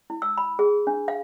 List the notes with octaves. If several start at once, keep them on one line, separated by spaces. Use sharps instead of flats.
E4
E6
B5
G#4
D4
F5